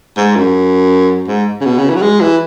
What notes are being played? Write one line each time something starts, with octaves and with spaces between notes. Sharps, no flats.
G#2
F#2
G#2
C#3
B2
C#3
E3
F#3
G#3
E3